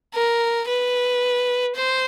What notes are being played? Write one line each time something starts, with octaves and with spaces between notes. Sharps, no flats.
A#4
B4
C5